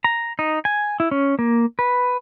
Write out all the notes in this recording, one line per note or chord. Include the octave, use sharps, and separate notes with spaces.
A#5
D#4
G#5
E4
C#4
A#3
B4